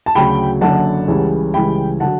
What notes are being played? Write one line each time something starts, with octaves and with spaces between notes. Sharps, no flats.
A5
D2 C#3 F#3 G5 B5
F#1 F#2 D3 F#5 A5
C#2 C#3 E3 G3
C#2 C#3 E3 G3 G5 B5
D3 F#3 F#5 A5